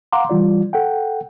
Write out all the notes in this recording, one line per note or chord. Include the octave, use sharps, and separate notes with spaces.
F5 F#5 A#5 C6 D6
E3 G3 F4 D5
A4 F#5 G5